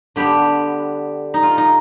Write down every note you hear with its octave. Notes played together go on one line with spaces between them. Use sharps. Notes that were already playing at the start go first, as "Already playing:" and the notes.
D3 G3 B3 D4 G4
D#4
F4
D#4